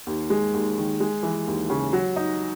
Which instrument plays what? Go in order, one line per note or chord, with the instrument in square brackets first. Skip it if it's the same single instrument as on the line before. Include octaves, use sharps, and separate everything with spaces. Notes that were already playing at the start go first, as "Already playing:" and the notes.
[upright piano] D#2
G#3
D#2
D#3
G#3
E3
D#2
C#3
F#3
D#4